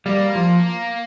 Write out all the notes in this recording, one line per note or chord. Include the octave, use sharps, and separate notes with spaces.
G3 A#3
F3